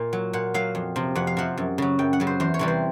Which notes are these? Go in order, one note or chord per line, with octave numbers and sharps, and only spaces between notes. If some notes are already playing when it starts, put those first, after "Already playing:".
Already playing: A#2
F#3
A#2 F#5
F#3 F5
F2
C3 F3
F2 F#5
F5
C3 F3 F#5
F#2
C#3 F#3
F#2 G5
F#5
C#3 F#3
C5
E2 C5
C#5
C3 E3 G3
C5